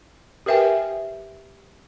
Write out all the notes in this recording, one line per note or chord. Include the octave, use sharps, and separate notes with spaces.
G4 A#4 B4 E5 G5 G#5